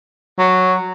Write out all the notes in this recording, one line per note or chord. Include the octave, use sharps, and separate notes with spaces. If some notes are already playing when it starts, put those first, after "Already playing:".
F#3